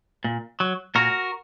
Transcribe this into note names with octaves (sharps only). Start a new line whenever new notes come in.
A#2
F#3
A#2 F#4 A#4